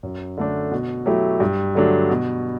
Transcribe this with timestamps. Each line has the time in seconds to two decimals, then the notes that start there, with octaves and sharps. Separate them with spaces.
0.03 F#2
0.38 D3 A3 D4
0.72 B2
1.06 F#3 A3 E4 G4
1.40 G2
1.75 D3 F#3 A3 D4
2.10 B2